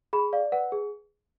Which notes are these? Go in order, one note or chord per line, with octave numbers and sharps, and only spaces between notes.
G#4 B5
D5 F5
B4 F#5
G#4